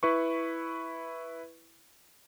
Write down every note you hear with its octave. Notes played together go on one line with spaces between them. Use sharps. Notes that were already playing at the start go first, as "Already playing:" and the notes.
E4 B4 C#6